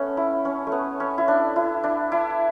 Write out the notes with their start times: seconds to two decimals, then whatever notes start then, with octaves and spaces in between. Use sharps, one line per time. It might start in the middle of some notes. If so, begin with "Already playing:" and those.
Already playing: A3 B3 C#4
0.17 E4
0.45 C#4
0.67 A3
0.72 B3
1.00 C#4
1.18 E4
1.28 D4
1.56 E4
1.84 D4
2.12 E4